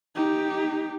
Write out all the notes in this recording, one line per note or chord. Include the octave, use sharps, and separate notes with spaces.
D#4 G4